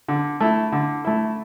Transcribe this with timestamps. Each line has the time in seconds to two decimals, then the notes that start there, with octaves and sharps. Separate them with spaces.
0.08 D3
0.40 A3 E4
0.72 D3
1.05 A3 E4